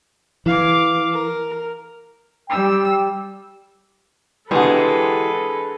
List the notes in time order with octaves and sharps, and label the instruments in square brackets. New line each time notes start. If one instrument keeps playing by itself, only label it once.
[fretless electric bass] E3 [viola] F5 D6
[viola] A#4
[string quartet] G3 E6 [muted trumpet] G5
[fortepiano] B1 D3 [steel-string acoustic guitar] E3 G4 [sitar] G#3 [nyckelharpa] A4 B4